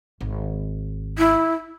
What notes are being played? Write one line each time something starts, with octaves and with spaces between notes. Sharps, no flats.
G#1
E4